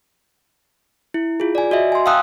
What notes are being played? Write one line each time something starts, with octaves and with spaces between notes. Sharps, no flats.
E4
F4 G#4
D5 G#5
F#4 D#5 E5
G#5 C6
F5 G5 A5 D#6 E6 F#6